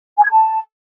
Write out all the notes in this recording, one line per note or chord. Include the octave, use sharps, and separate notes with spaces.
G#5
G#6
A5